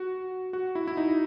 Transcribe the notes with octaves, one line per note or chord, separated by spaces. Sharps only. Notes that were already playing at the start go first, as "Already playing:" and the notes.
Already playing: F#4
F#4
E4
E4
D#4